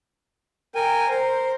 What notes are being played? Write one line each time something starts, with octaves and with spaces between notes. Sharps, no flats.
A#4 G5 G#5
A#4 C5